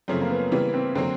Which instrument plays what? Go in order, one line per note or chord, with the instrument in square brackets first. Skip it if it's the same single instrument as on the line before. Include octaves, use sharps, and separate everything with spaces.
[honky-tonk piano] F#2 C#3 F3 A3 [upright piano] C4
[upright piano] A#3
B3
[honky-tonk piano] C#3 E3 G3 [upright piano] B3
[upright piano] C4
[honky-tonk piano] D3 F#3 A#3 [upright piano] C4